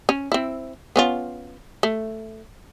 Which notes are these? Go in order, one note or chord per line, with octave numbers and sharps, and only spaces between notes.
C#4
C4 E4
B3 C#4 F4
A3